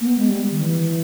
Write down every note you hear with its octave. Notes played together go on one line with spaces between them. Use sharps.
A#3
B3
G#3
G3
D#3
E3